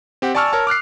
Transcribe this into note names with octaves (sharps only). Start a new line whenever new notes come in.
C4 G4 F#5
D5 G#5 A5 C#6 E6 F6
A#4 C#5 A5
D6 F6 F#6 C7